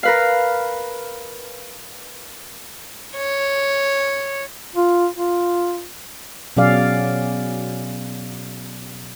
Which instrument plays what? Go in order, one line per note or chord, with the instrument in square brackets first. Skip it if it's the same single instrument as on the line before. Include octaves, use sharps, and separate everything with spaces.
[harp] A#4 B4 F5
[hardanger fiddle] C#5
[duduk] F4
F4
[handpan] B2 F#3 C#4 G#4 D5 F5